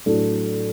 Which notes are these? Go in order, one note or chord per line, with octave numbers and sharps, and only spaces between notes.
A2 F#3 A3 D4 A4